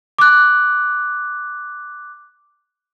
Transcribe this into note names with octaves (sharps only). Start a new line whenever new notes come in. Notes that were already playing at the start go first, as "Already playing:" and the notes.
D6 F#6